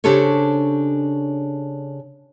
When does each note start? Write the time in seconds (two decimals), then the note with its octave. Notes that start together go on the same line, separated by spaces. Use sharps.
0.04 C#3 D4 G4 A4 C5 C#5